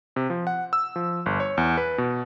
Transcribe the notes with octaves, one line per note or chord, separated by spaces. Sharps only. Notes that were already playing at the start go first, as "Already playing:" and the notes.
C3
F3
F#5
E6
F3
G1
C#5
E2
B4
B2